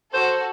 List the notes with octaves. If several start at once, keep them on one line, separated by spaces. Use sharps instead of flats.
F#4 A4 C5